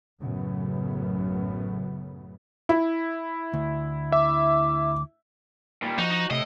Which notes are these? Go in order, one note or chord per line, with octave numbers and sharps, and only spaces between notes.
A1 F#2 A2 C#3 B3
E4
D2
E5 D6
A#2 G3
F3 D#4 F#4
D#4
A2 C3 D#5